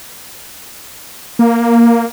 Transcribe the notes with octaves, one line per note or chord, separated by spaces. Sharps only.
A#3